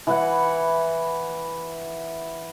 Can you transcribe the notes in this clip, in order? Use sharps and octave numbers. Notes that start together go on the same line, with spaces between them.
E3 E4 F#5